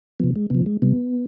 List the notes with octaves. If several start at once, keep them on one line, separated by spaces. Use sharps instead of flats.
C3 F3 B3
G#3
C3 F3 B3
G#3
C3 G3 B3